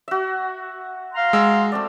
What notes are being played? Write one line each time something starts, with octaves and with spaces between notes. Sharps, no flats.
F#4 E5
F5 A#5 C6
G#3 E6
A3 C4 D5